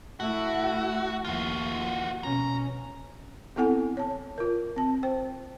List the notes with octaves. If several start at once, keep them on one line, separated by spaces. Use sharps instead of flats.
A3 E4 F#4
D#2 F3 F4 F#4
B2 C#4 A#5
B3 C4 E4 A4 F#5 G#5
C#5 A5
F4 A#4
C4 A5
C5 G5